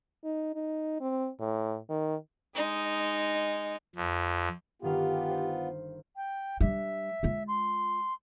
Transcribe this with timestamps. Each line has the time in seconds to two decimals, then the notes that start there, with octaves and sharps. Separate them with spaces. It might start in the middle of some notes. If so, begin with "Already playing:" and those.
0.24 D#4
0.55 D#4
1.01 C4
1.40 A2
1.90 D#3
2.56 G#3 D#4
3.96 F2
4.82 G1 D#3 B3 F4 G4 F5
5.31 C5
6.16 G5
6.61 G3 D4 E5
7.23 G#3 F4
7.47 C6